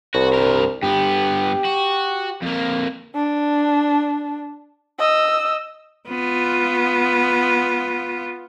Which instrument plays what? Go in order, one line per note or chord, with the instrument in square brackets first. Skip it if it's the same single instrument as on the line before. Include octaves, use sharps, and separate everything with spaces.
[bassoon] C2 [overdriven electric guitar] F#4
[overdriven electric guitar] G2 A#4
[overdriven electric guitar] G2 B3 [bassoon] G4
[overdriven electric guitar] F#4
F2 A#3
[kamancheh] D4
D#5 E6
[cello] B3 F4